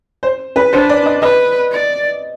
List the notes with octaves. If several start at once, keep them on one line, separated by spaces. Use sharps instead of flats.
C5
B4
D4 C5
D5
D#5
B4 D#5
D5